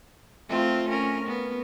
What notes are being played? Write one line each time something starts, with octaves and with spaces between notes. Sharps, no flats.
A3 C4 F4
C#4 A#4
B3